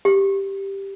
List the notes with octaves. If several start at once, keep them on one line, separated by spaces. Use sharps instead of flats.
G4